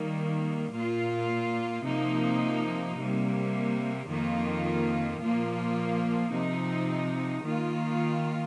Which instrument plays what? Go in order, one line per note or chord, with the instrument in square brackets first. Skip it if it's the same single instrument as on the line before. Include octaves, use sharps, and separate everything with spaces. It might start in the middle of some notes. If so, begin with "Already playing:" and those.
Already playing: [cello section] D#3 G3 A#3
A#2 A#3 F4
C3 F3 A#3 D#4
C3 G3 A#3
F2 D#3 A#3 F4
A#2 F3 A#3 F4
C3 F3 D#4
D#3 A#3 F4